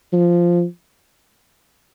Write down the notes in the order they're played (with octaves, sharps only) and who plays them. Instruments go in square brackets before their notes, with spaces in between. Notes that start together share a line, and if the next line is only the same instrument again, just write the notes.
[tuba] F3